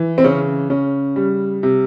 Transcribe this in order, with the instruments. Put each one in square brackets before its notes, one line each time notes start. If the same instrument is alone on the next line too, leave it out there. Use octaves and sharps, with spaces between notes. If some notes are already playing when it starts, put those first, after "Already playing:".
Already playing: [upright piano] E3
C4
C#3 C#4
C#3 C#4
G3
C3